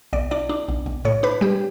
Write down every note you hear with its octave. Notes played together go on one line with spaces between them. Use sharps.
B1 D5
D4 D5
D4
B1
B1
A2 C#5
D4 B4
G3 G4